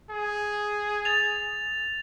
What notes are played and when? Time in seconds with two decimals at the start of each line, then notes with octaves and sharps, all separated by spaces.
0.11 G#4
1.05 A6 F7